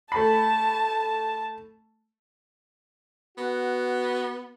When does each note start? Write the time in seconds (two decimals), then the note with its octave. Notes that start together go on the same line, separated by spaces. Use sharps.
0.12 A3 A5 B5
3.38 B3 F#4